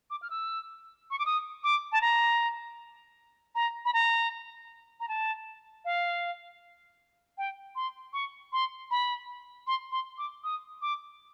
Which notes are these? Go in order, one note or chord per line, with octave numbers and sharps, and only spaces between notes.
D6
F6
E6
C#6
D6
D#6
D6
A5
A#5
A#5
B5
A#5
A#5
A5
F5
G5
C6
C#6
C6
B5
C6
C6
D6
D#6
D6